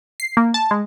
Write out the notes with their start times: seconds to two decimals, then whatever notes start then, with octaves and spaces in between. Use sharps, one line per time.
0.20 C7
0.37 A#3
0.54 A5
0.71 G#3